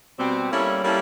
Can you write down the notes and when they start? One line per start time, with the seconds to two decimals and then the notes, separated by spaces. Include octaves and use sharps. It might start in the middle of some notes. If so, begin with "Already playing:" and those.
0.18 B2 G3 C4
0.51 G3 A#3 C#4 E4 A4
0.83 G3 A#3 C#4 E4 A4